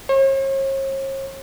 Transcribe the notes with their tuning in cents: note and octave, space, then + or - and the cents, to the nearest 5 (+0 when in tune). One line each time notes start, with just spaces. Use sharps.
C#5 -45